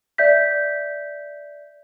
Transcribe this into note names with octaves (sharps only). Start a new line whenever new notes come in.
D5 E5 G6 B6